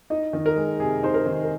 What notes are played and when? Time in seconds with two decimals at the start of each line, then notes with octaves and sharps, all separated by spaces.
0.10 D#4 D#5
0.33 D#3
0.46 A#4
0.56 G#3
0.80 C3 G#4
1.03 D#4 C5
1.14 A#4
1.26 D#3
1.43 A#4